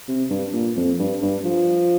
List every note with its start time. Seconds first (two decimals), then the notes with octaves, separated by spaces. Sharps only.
0.08 C3
0.30 G2
0.53 A#2
0.76 F2
0.99 G2
1.22 G2
1.45 F3